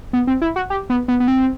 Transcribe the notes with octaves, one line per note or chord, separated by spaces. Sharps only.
B3
C4
E4
F#4
G4
B3
B3
B3
C4